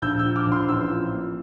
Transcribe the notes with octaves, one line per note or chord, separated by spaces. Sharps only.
A#1 E6 G6
E6 G6
F3
D6 F6
A#1
C6 E6
A1 C6 E6
F3
A#3